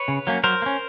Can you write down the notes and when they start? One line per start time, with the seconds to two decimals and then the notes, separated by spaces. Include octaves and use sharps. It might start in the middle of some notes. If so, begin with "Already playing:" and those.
Already playing: B4 C#5
0.08 C#3
0.27 F#3 A#3 C#4
0.44 F#3 A#4 C5
0.62 A#3
0.66 C#4